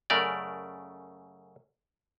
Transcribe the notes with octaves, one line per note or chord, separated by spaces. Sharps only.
F#2 C#3 A3 A#4 D5